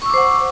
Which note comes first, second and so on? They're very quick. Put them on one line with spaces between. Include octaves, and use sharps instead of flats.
C#6 E6 D6 C5 F#5